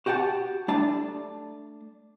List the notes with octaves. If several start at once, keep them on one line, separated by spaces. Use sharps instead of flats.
F#4 G4 F#5 G5 A5
A3 D4 A5